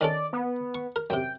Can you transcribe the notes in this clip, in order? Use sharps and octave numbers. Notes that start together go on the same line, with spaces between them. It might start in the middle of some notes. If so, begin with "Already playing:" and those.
D#3 C#4 A4 D5
B3
C#6
A#4
F#2 C3 G5